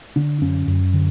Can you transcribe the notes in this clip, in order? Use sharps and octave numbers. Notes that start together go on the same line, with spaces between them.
D3 D4
F#2 C#4
F#2
D3